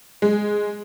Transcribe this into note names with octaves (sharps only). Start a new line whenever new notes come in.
G#3